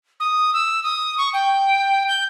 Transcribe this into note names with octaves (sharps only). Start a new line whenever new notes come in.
D#6
E6
D#6
C#6
G5
G6